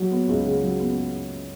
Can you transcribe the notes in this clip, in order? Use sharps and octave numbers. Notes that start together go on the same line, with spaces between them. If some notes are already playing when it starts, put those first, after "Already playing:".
Already playing: F#3
B3
C#2
C#3
F#3
B3